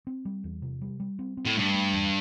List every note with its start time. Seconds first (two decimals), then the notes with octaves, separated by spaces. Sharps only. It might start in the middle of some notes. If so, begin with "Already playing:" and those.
0.07 C4
0.25 G3
0.44 E2
0.62 C3
0.81 G3
1.00 G3
1.19 C4
1.37 C4
1.45 A2
1.56 G2 A3
1.74 A3
1.93 E2